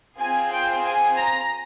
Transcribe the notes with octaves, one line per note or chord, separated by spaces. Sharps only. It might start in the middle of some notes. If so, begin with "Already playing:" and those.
C4 F4 G#4 G#5
G5
G#5
A#5